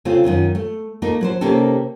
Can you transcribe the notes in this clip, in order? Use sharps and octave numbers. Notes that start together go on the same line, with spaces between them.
C#3 A3 C4 F4
F#2 D#3 C#4 F4
A3
A3 A#3 D#4 A4
F#3 B4 C5
C3 A#3 C#4 D#4 G4 A4